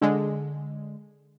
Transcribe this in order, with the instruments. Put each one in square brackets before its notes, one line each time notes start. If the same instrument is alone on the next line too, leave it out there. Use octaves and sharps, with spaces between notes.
[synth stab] D3 G#3